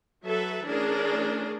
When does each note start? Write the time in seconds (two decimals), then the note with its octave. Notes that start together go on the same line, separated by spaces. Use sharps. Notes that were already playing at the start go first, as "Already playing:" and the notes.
0.24 F#3 A4 B4 E5
0.65 E3 A3 C#4 D4 G#4 A#4